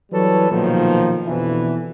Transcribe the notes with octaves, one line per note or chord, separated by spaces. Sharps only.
E3 F#3 G3 A4 B4 C#5
B1 A#2 D#3 F3
F2 B2 D3 E3